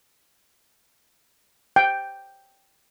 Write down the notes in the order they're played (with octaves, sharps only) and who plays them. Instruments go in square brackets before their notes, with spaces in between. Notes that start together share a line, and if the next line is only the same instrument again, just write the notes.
[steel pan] G5